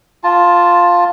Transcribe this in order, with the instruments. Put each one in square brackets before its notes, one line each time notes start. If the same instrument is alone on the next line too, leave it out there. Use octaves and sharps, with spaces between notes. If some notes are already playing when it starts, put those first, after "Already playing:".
[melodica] F4 A5